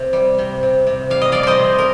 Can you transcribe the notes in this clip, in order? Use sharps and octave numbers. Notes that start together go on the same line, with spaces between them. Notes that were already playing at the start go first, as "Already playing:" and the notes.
Already playing: C3
G3
C3
C3
C3
G3 F5
D#5
G3 D5 F5
C5 D5 D#5
C3
A#4